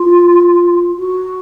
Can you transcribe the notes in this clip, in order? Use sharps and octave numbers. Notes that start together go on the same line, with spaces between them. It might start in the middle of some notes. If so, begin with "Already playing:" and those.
Already playing: F4
F#4